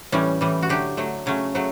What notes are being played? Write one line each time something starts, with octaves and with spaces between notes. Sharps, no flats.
A2 E3 G3 C#4
A2 E3 G3
F#4
D3 F#3 A3 G4
D3 F#3 A3
C#3 F#3 A3 C#4
C#3 F#3 A3